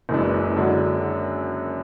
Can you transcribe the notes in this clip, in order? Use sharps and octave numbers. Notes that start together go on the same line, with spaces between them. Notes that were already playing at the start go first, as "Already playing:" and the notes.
F#1 F#2 E3 G#3 D4
F#2 D3 G#3 D4 F#4